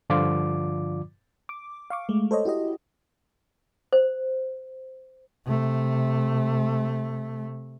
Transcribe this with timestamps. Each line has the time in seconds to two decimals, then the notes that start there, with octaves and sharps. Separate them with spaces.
0.10 G2 D3 F3 F4 D5 D6
1.49 D6
1.90 F5 C#6 D6
2.09 G#3 A3
2.31 A4 C5 C#5 D#5
2.45 E4 F#4 G4 D#5
3.93 C5
5.45 C3 A3